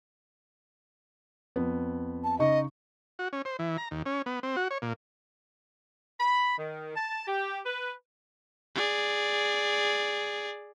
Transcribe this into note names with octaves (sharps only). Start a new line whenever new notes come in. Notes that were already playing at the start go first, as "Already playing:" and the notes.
F2 B3
A5
C#3 D#4 D#5 C#6
F#4
C#4
C5
E3
A#5
D#2
C#4
B3
C4
F#4
C#5
A#2
B5
D#3
A5
G4
B4
G#4 D5